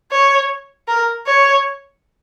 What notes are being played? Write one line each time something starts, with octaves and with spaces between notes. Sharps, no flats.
C#5
A#4
C#5